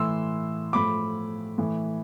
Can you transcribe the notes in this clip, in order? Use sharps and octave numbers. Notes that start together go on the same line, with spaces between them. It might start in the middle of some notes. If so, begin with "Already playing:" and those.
Already playing: A2 E3 C6 E6
A2 F3 B5 D6
A2 E3